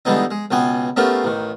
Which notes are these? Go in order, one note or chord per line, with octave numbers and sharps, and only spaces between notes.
D3 E3 G3 G#3 B3 D#4
G#3
C#2 B2 B3 G5 G#5
A3 B3 C#4 F4 G4 A#4
A1 D#3